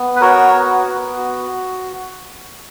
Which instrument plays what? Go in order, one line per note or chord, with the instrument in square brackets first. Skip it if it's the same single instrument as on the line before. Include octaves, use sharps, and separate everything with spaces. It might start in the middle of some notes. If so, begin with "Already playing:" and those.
Already playing: [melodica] B3
B4
F#4 A#4 C#5
B3
B3
F#4